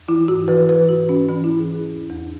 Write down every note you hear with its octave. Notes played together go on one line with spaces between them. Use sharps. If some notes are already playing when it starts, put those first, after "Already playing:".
Already playing: E2
E3 E4
G#2 F#4
E3 B4
E3 B4
G#2 F#4
G#2 C#4
E3 C#4
G#2 E4
G#4
E3
G#4
E2
E2